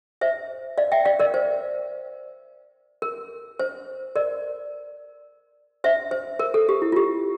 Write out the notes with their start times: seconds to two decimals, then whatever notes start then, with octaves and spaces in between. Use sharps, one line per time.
0.21 C5 E5
0.78 D5 F5
0.92 E5 G5
1.05 D5 F5
1.19 A#4 D5
1.34 C5
3.02 A#4
3.59 C5
4.16 A#4 D5
5.84 C5 E5
6.11 C5
6.39 A#4
6.54 A4
6.69 G4
6.82 E4
6.92 F4
6.96 G4